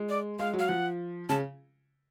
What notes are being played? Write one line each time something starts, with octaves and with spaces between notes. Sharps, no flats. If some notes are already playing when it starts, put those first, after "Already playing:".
Already playing: G#3
D5
G#3 F5
F#3
F5
F3 F#5
C#3 A5